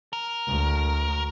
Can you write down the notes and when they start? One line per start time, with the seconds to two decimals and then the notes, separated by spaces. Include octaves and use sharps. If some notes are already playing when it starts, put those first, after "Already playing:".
0.13 A#4
0.47 D2